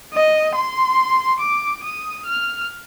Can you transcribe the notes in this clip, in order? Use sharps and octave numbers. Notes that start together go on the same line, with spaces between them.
D#5
C6
D6
D#6
F6